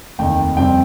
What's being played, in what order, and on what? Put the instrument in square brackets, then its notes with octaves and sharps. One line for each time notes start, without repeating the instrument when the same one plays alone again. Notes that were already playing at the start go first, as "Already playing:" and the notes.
[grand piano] F1 D#2 D#3 G5
F2 C3 G3 C4 G5